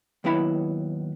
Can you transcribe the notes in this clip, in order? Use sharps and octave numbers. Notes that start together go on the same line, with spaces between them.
D#2 F#3 B3 E4 E5 B5